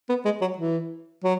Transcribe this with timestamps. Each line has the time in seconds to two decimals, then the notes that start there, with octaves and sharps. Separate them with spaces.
0.09 B3
0.25 G#3
0.41 F#3
0.58 E3
1.24 F#3